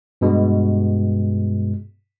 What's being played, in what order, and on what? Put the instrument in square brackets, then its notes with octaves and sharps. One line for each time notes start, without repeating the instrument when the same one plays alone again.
[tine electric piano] G2 B2 G#3